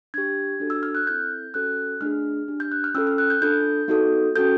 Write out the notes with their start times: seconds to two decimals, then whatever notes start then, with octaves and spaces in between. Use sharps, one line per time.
0.14 D4 G4 G#6
0.60 D4 F#4 A4
0.70 E6
0.83 F6
0.95 F#6
1.07 C4 E4 A4 G6
1.54 C#4 F#4 A4 F#6
2.01 A3 D4 F4 G#4 F6
2.48 D4 G4
2.60 G6
2.72 F#6
2.84 F6
2.95 C#4 F4 A4 E6
3.07 F6
3.18 F#6
3.30 G6
3.41 D4 F4 A4 G6
3.88 B3 D#4 F#4 A4
4.36 C#4 F#4 A4 G6